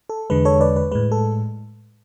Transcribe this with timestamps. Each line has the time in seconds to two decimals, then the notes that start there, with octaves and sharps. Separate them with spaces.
0.09 A4
0.30 E2 D3 G#3 B4
0.45 A4 C#5
0.61 B4 D5
0.76 B4
0.91 A2 G#3 B4
1.12 A4